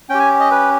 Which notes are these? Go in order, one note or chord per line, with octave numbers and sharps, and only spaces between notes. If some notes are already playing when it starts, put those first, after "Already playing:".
C#4 G4 G5
G#5
D#5
B4